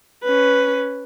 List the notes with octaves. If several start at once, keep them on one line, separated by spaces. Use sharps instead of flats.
C#4 B4